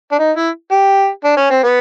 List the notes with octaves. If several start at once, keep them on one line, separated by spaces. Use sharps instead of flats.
D4
D#4
E4
G4
D4
C#4
C4
B3